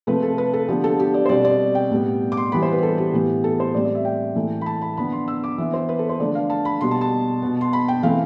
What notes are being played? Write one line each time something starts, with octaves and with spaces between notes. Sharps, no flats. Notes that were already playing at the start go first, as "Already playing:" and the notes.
C3 F3 A3 B4
A4
B4
A4
D3 F3 B3 G4
A4
G4
D5
C5
B2 G3 C4 D5
D5
G5
A2 G3 B3
D6
C6
E3 G3 B3 B5
C5
B4
G4
A4
G4
A2 E3 B3
A4
C5
A2 G3 C4 D5
D5
E5
G5
A2 E3 A3
B5
A5
B5
D3 F3 B3 B5
C6
E6
D6
E3 B3 E5
C5
B4
A4
C5
D3 F3 A3 D5
F5
A5
B5
B2 G3 B3 C6
A5
A5
B2 B3
C6
B5
G5
E3 A3 C4 F5